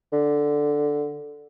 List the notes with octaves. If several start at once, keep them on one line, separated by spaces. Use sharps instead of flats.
D3